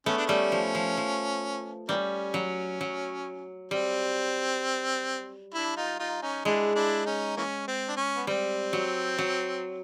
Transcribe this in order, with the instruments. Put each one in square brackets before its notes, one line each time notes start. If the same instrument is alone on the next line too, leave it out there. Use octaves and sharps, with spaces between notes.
[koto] A3 B3 [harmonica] C#4
[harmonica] D4
[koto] G3 A3 [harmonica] C#4
[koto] F3
F3
F3
[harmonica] E3 A#3 C#4 [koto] G3
[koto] F#3
F#3
[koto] G3 [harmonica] C4
[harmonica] D4 E4
D#4 F4
D#4 F4
C#4 D#4
[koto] G#3 [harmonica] D4 E4
[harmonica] D4 E4
C#4 D#4
E3 A#3 C#4
C4
D4
C#4
B3
[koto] G3 [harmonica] C4
[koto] F#3
F#3